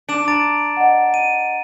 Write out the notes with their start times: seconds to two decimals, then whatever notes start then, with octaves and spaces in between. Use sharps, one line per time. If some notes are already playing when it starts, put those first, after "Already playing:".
0.09 D4 D7 E7
0.28 A#5 A6 D7
0.77 D#5 F#5
1.14 D#7